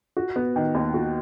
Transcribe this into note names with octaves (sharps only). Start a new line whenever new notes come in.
F#4
B3
D#3
D#2
F#4